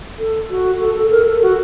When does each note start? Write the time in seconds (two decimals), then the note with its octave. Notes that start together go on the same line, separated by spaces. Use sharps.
0.18 A4
0.50 F#4
0.80 A4
0.96 A4
1.11 A#4
1.27 A4
1.42 F#4